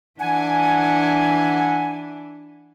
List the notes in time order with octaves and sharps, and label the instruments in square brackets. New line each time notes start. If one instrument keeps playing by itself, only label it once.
[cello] E3 D4 [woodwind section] F#5 G#5